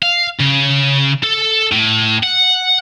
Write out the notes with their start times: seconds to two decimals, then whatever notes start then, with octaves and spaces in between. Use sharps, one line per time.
0.03 F5
0.40 C#3
1.23 A4
1.72 A2
2.23 F#5